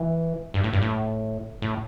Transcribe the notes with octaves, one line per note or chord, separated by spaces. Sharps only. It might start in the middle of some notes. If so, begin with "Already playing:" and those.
Already playing: E3
G2
A2
G2
A2
A2